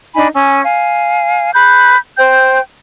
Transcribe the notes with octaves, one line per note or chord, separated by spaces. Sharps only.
D4 D#4 G#5 B5
C#4 G#5 E6
F5 G#5
B5 F#6 G6
C5 G5 G6